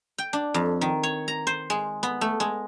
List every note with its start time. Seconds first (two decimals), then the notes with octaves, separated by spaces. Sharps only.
0.18 G5
0.33 D4
0.54 F2
0.81 D#3
1.03 C#5
1.28 A#5
1.47 C5
1.70 G#3
2.03 B3
2.21 A3
2.40 G#3